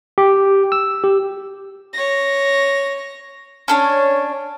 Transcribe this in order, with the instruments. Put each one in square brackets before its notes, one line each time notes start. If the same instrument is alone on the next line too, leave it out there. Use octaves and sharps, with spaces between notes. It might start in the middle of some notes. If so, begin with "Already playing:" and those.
[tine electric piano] G4
E6
G4
[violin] C#5 A#6
[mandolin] C#4 D4 C#5